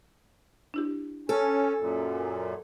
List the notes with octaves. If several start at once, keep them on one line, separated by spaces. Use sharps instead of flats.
D4 E4 G4
C#4 A4
G#5
F#2 A#2